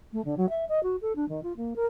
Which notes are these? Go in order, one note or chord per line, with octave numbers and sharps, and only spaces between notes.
A3
D3
F#3
E5
D#5
F#4
A4
D4
D#3
F4
A#3
A#4